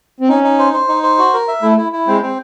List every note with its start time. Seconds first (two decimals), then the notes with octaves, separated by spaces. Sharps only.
0.20 C4
0.29 C#4 D#4
0.44 D#4
0.59 C5
0.73 C5
0.88 D#4
1.03 C5
1.18 F#4
1.34 A#4
1.48 E5
1.62 A3 E4
1.78 E4
1.92 E4
2.07 G#3 C4
2.23 C4